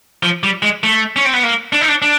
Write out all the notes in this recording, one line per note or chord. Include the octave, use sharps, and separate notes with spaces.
F3
G3
G#3
A3
C#4
C4
B3
A#3
D4
D#4
D4
D4